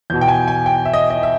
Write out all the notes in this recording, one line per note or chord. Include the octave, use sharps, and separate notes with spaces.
E2 B2 G6
G5
G#5
G#5
G5
E5
D#5
D#5
E5